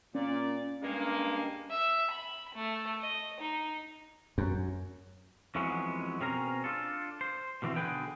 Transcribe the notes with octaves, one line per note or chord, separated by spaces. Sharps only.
A#2 C#4 D5
G2 G#3 A#3
E5
B5
A3
D#5
D#4
F#2
F2 E3 F#3 G#3 B3 C#4
B2 C4 C#4 G#4 A#4 A#5
D4 F4 A4
C5
B2 D3 E3 A#3 C4
B1 F#2 D3 G#4 B4 G5